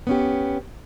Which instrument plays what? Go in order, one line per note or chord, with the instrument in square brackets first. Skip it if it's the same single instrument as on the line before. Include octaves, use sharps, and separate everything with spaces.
[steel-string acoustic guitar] B3 C#4 G4